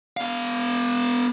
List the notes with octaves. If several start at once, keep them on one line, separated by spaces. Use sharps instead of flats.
B3 F5